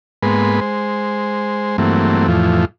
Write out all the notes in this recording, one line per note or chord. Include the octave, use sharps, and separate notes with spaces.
G#2 G#3 A#3 B3 B4 C6
G#3 C5
G2 E3 F#3 A3 A#3 C4
F2 A2 E3 F3